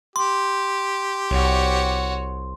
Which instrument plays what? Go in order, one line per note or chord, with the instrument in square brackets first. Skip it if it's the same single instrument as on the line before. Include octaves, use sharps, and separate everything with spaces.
[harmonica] G4 [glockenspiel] C6
[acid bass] C2 [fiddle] F#4 C#5